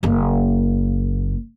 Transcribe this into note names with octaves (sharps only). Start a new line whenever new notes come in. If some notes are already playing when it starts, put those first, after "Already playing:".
F#1 A#3